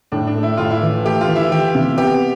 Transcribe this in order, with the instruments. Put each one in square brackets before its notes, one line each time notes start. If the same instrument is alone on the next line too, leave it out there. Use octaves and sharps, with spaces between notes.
[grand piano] A2 [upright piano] D4
[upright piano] D4
[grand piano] A3
[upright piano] E4
[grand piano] A2 [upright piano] F4
[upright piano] E4
[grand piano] E3
[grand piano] A3 [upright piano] G4
[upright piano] F4
[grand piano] E3
[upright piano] E4
[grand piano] E3 [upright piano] G4
[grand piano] C3
[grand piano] B3 [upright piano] G4